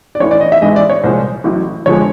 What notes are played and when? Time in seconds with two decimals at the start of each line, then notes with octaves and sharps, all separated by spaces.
0.15 D5
0.20 A1 A2 E3 C#5
0.31 D5
0.41 D#5
0.52 E5
0.61 A1 G#2 E3 G#3 D#5
0.76 D5
0.90 C#5
1.04 C2 A#2 F3 G#3 C5
1.44 A1 A2 F#3
1.86 F2 D3 F3 G#3 C#5